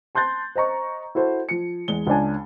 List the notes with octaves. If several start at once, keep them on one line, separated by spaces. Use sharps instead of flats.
A5 C6 F#6 G6 A6
C5 D#5 A#5 C#6
E4 F#4 A4 C5
F3 C#7
E2 G#3 G7
C#2 G#3 D4 G#5